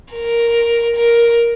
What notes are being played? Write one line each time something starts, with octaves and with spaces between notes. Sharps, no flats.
A#4
A#4